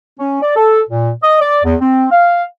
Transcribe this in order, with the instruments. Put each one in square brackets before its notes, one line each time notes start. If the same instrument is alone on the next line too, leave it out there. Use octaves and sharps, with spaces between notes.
[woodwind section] C#4
D5
A4
A#2
D#5
D5
E2
C4
F5